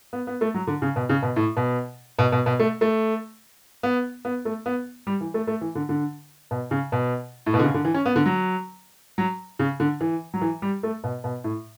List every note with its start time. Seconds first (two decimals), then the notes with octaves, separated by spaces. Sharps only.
0.13 B3
0.27 B3
0.41 A3
0.54 F#3
0.67 D3
0.82 C#3
0.96 B2
1.09 C#3
1.23 B2
1.36 A2
1.57 B2
2.19 B2
2.32 B2
2.46 B2
2.60 A3
2.81 A3
3.83 B3
4.25 B3
4.45 A3
4.66 B3
5.07 G3
5.21 E3
5.34 A3
5.47 A3
5.61 E3
5.75 D3
5.89 D3
6.51 B2
6.71 C#3
6.92 B2
7.46 A2
7.54 B2
7.59 D3
7.64 C#3
7.74 D3
7.85 E3
7.94 C#4
8.06 B3
8.16 D3
8.26 F#3
9.18 F#3
9.59 C#3
9.80 D3
10.01 E3
10.34 F#3
10.41 E3
10.62 G3
10.83 A3
11.04 B2
11.24 B2
11.44 A2